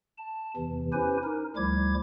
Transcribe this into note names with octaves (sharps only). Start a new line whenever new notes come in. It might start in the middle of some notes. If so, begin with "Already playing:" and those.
A5
E2 C3 E3
C#4 E4 G4 B4 C5 G#5
D#4 A#4
D2 F3 G3 E4 D6 G#6